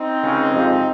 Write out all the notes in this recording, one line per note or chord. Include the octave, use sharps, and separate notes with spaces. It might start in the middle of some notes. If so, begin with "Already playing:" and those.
Already playing: C4 D#4
C#2 C#3 G#3
F2 C3 F3 G#3